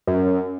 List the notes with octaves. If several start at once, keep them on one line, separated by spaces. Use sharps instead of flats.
F#2